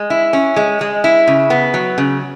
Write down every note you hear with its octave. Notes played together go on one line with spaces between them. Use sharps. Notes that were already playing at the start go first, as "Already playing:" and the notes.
Already playing: G#3
E4
C#4
G#3
G#3
E4
C#3
B3
F#3
C#3